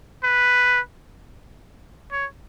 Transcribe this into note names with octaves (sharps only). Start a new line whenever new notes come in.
B4
C#5